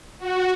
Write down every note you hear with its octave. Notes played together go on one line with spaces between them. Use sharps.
F#4